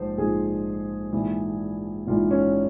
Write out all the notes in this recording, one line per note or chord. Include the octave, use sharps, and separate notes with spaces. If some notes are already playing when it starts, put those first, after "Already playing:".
Already playing: A#1 G#2 F3 C5
A#1 G#2 F3 G#4
A#1 G#2 E3
A#1 G#2 E3 F4
C#4